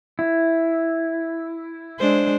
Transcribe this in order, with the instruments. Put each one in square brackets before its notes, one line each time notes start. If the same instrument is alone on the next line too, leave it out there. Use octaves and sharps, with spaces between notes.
[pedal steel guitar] E4
[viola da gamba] G#3 D4 C5